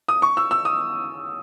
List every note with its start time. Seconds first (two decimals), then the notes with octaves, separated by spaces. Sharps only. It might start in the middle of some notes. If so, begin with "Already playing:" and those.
0.08 D#6
0.22 C#6
0.37 E6
0.51 E6
0.65 D#6